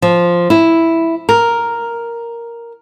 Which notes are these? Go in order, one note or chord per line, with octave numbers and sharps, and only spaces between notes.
F3
E4
A#4